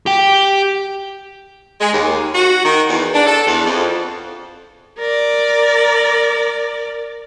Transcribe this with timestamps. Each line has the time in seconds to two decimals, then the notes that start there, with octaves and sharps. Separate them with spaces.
0.06 G4 G5
1.81 G#3
1.93 D#2
2.35 F#4
2.64 D#3
2.89 E2
3.14 D4
3.26 A4
3.47 E2
3.66 F2
4.98 A#4 D5